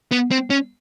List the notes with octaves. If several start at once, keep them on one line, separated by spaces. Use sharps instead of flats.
B3
C4
C#4